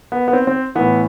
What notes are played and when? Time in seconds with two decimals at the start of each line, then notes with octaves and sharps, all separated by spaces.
0.12 B3
0.28 B3
0.33 C4
0.47 C4
0.75 A2 E3 B3